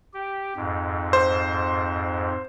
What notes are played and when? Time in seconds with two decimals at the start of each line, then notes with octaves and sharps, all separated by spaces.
0.14 G4
0.56 F2 G#2
1.13 C5